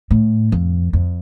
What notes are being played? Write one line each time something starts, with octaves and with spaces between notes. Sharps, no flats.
A2
F2
F2